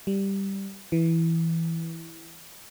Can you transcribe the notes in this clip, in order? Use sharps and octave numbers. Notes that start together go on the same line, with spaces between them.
G3
E3